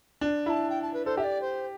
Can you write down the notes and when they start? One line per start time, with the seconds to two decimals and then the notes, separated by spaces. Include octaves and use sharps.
0.21 D4
0.45 E4 A5 B5
0.69 G5
0.81 A5
0.93 B4
1.05 A4 C5
1.17 G4 D5 E5
1.41 C5